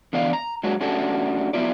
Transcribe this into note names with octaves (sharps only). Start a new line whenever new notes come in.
D3 E3 B3 D5 F5
A#5
F#3 G#3 A#3 D4 F#4 C#5
A3 C#4 D4 F#4 G4 A4
F#3 B3 E4 F4 D5